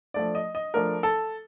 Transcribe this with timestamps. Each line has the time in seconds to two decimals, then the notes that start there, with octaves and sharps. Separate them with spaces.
0.14 F3 A3 D4 D5
0.35 D#5
0.55 D#5
0.74 F3 A3 D4 A#4
1.03 A4